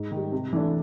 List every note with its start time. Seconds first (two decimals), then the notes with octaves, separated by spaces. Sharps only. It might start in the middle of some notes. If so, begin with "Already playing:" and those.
Already playing: G#2
0.12 D#3
0.17 G3
0.32 C3
0.53 E3 A3 D4